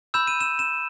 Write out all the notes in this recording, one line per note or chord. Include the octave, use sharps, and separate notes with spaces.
B5 E6 G6 E7
D#7
E7
E7